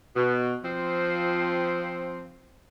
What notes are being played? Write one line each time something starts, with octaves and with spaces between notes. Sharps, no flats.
B2
F3 C4